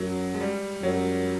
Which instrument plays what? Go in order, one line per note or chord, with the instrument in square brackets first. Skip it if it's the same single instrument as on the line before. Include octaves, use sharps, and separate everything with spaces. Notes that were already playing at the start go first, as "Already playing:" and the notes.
Already playing: [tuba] F#2 [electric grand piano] F#3
[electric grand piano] G#3
G3
[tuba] F#2 [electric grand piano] F#3